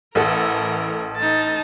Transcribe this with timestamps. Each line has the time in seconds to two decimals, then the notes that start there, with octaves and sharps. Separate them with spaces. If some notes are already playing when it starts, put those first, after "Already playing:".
0.15 A1 E3 A4 A#4 F#5
1.16 D#4 A5